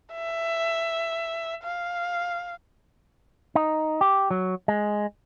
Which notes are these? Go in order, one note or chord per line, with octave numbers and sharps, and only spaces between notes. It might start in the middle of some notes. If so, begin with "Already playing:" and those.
E5
F5
D#4
G4
F#3
G#3